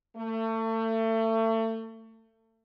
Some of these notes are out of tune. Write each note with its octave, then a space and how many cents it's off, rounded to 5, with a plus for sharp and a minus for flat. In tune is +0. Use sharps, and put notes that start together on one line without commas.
A3 +30